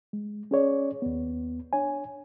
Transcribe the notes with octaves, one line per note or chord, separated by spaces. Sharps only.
G#3
C#4 G#4 C#5 D5
D#2 B3
D4 C#5 G#5